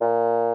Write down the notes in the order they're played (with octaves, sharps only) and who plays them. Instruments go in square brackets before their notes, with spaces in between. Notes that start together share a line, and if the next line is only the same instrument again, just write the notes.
[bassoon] A#2